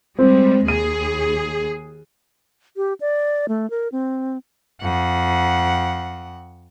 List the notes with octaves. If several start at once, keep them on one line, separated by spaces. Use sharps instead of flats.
G3 G#3 C4
D#2 G#4 D#7
G4
D5
A3
A#4
C4
F2 F#5